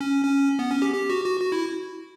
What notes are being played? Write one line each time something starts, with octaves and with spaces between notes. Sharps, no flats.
C#4
C#4
B3
C#4
G4
G4
F#4
F#4
F#4
E4